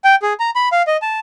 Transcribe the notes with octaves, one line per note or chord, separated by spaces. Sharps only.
G5
G#4
A#5
B5
F5
D#5
A5